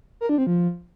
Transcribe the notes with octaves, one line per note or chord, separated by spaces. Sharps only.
A#4
D4
C4
F3